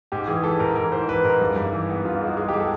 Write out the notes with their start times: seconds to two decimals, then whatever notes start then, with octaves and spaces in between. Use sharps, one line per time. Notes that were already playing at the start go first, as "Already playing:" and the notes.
0.12 G#2 G4
0.27 E3 G#4
0.43 E3 A4
0.60 G#2 A#4
0.75 E3 A#4
0.92 G#2 C5
1.08 E3 B4
1.24 G#2 A#4
1.41 G2
1.56 G2
1.72 E3
1.90 B3
2.05 G2 F4
2.21 G#3
2.27 F#4
2.37 G#3
2.49 G#3 G4
2.60 A4